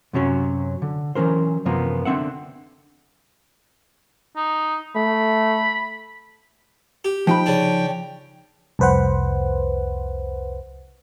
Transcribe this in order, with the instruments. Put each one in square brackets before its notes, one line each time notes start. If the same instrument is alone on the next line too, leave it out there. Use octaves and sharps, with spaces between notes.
[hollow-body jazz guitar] F#2 C3 F#3 C#4
D3
E3 F#3 C#4 A#4 C5
F#2 C3 E3 F3 A#3 B3
D3 C4 E5 F#5
[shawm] D#4
[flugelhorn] A3 [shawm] B5
[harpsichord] G4
[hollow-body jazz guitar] F3 D#4 B5 [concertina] G5
[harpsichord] C#3 D4
[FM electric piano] C2 F2 B4 C5 F#5